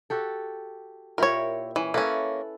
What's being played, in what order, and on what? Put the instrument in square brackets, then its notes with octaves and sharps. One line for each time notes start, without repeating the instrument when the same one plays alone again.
[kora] F#4 G4 A4
[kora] A#2 E4 G4 [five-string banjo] A#4 C#5
[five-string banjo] E3 [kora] C#4
[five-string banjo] A#3 C#4 [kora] E4 A4 B4